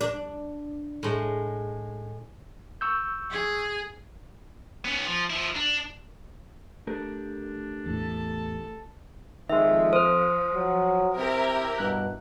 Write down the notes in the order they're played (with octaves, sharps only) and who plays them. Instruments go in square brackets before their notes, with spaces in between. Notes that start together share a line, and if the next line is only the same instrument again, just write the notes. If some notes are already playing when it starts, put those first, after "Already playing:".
[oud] D4
[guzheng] A2 G#3
[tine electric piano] C#6 E6 G6
[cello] G#4
[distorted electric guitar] B3 C#4
F3
F3 E4
D4
[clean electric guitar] A3 G4 A#4 [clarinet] D4
[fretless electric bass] E2 A2 [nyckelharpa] A4 A5
[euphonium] F2 [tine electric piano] D#3 G#3 [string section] F3 [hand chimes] E5
[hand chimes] C5 [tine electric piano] D#6 F6
[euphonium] F#3
[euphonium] C3 [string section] E4 G4 A#4
[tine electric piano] G2 F#6 [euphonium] B2